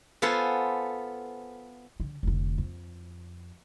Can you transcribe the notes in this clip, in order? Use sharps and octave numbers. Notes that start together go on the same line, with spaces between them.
B3 F4 A4 C5 F#5 G#5
D3
F1 D3
F2